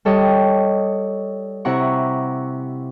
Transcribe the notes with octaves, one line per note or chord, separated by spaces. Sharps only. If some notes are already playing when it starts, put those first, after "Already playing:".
G3 A4 C#5 D#5 G5
C3 E4 F#5 A#5 C#6